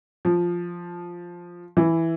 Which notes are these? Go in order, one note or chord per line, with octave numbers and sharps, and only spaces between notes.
F3
E3